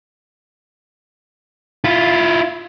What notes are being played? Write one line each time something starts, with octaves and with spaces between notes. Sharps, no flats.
E4 F4